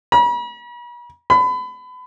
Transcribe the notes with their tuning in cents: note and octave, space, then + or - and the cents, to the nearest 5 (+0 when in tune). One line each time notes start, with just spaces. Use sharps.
B5 -45
B5 +30